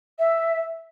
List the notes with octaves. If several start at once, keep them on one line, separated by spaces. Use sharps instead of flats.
E5